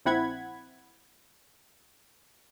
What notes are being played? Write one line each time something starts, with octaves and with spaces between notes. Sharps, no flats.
A#1 C4 E4 F#5 B5 G#6